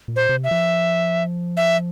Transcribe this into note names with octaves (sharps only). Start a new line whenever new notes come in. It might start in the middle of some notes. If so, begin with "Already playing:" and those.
A#2
C5
C3
E5
F3
E5